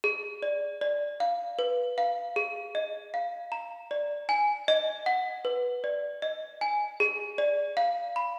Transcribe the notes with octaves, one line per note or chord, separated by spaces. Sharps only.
G#4
D5
D5
F5
B4
F5
G#4
D#5
F5
A#5
D5
G#5
D#5
F#5
B4
D5
D#5
G#5
G#4
D5
F5
B5